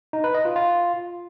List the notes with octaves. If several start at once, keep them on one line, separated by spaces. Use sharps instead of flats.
D#4
B4
D#5
F4
F4